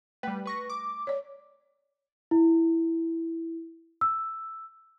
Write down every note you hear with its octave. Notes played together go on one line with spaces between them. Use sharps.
G3 A3 B4 G5
B4 C#6 A#6
D6
C#5 D5
E4
E6